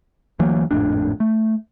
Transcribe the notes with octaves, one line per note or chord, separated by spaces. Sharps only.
D2 E3 F#3 A#3
G#1 F2 A2 D4
A3